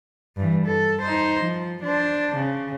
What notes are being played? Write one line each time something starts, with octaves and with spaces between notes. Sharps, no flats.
G2 E3
A4
D#4 C5
F3
D4 C5
C#3